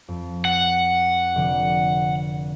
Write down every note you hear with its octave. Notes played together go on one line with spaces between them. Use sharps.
F2
F#5
F1 D3 G5